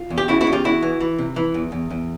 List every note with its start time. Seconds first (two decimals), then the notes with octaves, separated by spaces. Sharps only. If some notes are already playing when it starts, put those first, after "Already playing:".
Already playing: F4
0.10 E2
0.18 G4
0.28 C#3 E4 F#4
0.41 E4 F#4
0.47 E2
0.52 F4 G4
0.64 E2 E4 F#4
0.82 E3
1.01 E3
1.18 C3
1.36 E3
1.54 E2
1.72 E2
1.90 E2